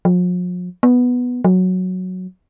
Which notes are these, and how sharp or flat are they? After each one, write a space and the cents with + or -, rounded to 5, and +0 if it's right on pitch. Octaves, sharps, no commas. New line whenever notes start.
F3 +45
B3 +0
F#3 -5